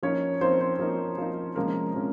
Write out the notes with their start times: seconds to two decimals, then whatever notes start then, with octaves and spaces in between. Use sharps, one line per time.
0.03 F3 A#3 C#4 D#4 C#5
0.41 F3 A#3 C4 D#4 C5
0.60 C4 C5
0.79 F3 A#3 D#4
1.18 F3 A#3 D#4
1.56 C3 F3 G#3 A#3 C#4 A#4
1.94 C3 F3 G#3 C#4